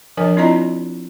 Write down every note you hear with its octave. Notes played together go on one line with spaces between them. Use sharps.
F3 D4 A#4 D#5 G#5
C4 E4 F4 D5 D#5 A#5